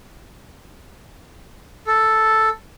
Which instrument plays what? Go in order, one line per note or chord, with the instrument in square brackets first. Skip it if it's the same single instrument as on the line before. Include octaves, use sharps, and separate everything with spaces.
[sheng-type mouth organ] A4